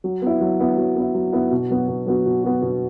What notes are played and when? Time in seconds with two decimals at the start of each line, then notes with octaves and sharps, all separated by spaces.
0.04 F#3
0.22 B3 E4
0.41 F#3
0.60 B3 E4
0.77 F#3
0.96 B3 E4
1.14 F#3
1.33 B3 E4
1.51 B2
1.70 F#3 B3 F#4
1.88 B2
2.06 F#3 B3 F#4
2.26 B2
2.44 F#3 B3 F#4
2.62 B2